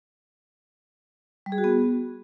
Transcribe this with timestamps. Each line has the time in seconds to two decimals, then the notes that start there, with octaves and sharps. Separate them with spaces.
1.46 G3
1.52 G#4
1.58 F#4
1.64 B3